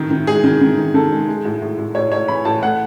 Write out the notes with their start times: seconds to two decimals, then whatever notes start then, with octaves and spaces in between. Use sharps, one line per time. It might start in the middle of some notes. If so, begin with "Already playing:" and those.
Already playing: A2 D#3
0.11 D#3
0.27 G#3 G#4
0.44 D#3
0.61 D#3
0.78 D#3
0.94 D#3 A4
1.12 G#3
1.28 G#3
1.45 A2
1.62 A2
1.79 A2
1.95 A2 C#5
2.12 A2 C#5
2.28 E3 B5
2.45 A2 A5
2.62 A3 F#5